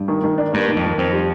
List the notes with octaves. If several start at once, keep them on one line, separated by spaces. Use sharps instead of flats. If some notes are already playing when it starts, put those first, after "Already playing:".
Already playing: G2
D#3
D#3
D4
G2 A#3
D#3
F2
D#3
F2 C4
G3